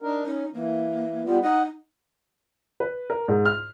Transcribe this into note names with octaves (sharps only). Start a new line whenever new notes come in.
D4 D#4 A#4
C#4 D#4
E3 A#3
G3 B3 F4
D#4 D#5 F#5
B4
A#4
G#2
F6